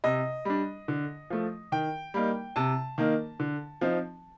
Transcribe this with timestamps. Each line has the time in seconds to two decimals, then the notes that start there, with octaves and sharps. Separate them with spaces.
0.04 C3 D#5
0.45 G3 D4
0.88 D3
1.30 F3 A3
1.72 D#3 G5
2.14 G3 A#3 D#4
2.56 C3 A5
2.98 D#3 A#3 D#4
3.40 D3
3.81 F3 C4 D#4